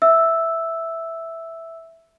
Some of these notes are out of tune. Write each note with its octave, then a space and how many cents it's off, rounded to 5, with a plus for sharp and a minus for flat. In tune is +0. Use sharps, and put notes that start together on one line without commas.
E5 +0 E6 +0